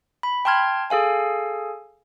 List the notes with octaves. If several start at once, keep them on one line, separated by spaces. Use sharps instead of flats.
B5
G5 A5 C6 F6 G#6
G#4 A4 F5 G#5